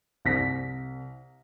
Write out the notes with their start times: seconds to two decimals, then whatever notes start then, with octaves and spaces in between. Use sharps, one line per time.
0.25 C2 A#6 B6